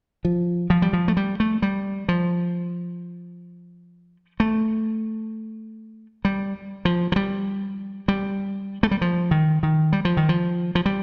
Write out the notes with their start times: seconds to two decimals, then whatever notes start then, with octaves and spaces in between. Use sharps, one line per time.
0.25 F3
0.70 F3
0.82 G3
0.93 F3
1.08 A3
1.17 G3
1.40 A3
1.62 G3
2.09 F3
4.40 A3
6.25 G3
6.85 F3
7.12 F3
7.16 G3
8.08 G3
8.83 A3
8.91 G3
9.01 F3
9.31 D#3
9.63 D#3
9.93 G3
10.05 F3
10.17 D#3
10.29 F3
10.75 F3
10.86 G3